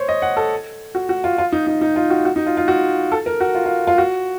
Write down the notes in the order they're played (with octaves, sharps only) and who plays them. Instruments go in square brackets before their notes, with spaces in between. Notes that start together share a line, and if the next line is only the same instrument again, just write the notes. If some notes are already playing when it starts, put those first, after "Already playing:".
Already playing: [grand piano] C5 C#5
D#5
F#5
A4
F#4
F#4
F4
F4
D#4
D#4
D#4
F4
F#4
F#4
D#4
F4
F4
F#4
A4
A#4
F#4
F4
F4
F4
F#4